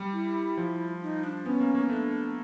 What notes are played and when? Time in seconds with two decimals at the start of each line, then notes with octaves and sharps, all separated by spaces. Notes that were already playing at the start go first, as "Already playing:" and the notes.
Already playing: G3
0.13 E4
0.57 F3
1.01 D#4
1.24 D4
1.45 B3 C#4
1.60 A#3
1.75 A#3
1.89 A3 D4